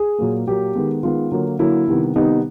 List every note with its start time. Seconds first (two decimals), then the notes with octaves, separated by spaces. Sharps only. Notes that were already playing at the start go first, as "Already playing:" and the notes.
Already playing: G#4
0.19 A#2 F#3 A#3
0.47 A#2 F#3 A#3 G4
0.75 D#3 G#3 B3
1.03 D#3 G#3 B3 F4
1.32 D3 F#3 A#3
1.59 D3 F#3 A#3 E4
1.87 C3 D#3 G3 B3
2.15 C3 D#3 G3 B3 D#4